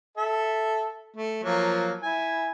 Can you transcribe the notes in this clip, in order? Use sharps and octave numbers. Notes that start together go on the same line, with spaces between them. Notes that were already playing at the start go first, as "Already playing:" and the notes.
A4 E5
A3
F3 F#3 A#3
E4 G#5